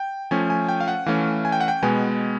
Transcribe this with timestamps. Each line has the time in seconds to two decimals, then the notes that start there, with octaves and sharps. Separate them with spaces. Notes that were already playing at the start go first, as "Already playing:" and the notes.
Already playing: G5
0.31 F3 A3 C#4 G#5
0.50 G#5
0.69 G5
0.80 F5
0.88 F#5
1.06 E3 A3 C#4 F5
1.45 G#5
1.52 G5
1.60 F#5
1.68 G5
1.83 B2 G#3 B3 G#5